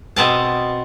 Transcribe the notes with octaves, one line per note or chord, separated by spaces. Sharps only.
B2 B3 C4 A5